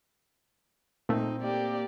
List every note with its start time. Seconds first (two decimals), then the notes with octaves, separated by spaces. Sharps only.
1.09 A#2 A3 C4 D#4
1.42 A#3 G4 D5